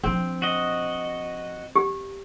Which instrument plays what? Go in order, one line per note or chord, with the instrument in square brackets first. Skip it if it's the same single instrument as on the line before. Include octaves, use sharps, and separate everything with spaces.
[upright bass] F3 D4 [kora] C4
[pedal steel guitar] F#4 D#5
[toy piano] G4